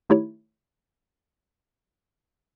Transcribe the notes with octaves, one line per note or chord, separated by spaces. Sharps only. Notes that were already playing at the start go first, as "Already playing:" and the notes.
D#3 A3 D#4 E4 G4 C#5